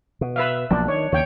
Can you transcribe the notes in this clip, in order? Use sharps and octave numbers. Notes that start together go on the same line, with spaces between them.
B2
B4 E5 F5
B1 F3 A#3 D4
D#3 C#5
D#2 C#3 C#5 G5